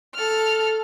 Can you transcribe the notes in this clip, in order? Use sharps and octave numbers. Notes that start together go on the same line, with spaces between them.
A4 F6